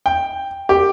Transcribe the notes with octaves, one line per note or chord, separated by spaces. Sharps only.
G5
G4